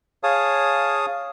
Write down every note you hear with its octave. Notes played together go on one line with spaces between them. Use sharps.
G#4 C#5 F5 A5 D#6